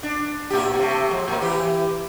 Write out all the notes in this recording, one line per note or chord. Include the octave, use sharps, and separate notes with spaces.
D4
A2 G4
C3 A3
F3 G#3
A2 A#3
E3 G4